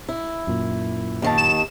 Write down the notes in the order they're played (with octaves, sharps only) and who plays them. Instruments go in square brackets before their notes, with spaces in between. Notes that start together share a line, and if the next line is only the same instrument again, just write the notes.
[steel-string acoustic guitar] E4
[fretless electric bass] F#2 A#2
[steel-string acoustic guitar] D#2 D#3 A5
[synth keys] E7